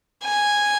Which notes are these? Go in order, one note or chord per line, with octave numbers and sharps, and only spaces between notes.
G#5